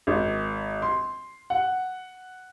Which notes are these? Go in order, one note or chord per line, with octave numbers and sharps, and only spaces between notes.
G#1
C6
F#5